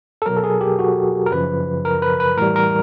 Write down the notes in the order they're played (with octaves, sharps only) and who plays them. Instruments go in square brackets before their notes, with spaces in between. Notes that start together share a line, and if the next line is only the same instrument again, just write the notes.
[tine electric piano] A4
B2 F#3 A#4
A4
G#4
G4
F#4
A#4
F#2 C#3 F3 B4
A#4
B4
B4
A2 E3 G3 A#4
A#4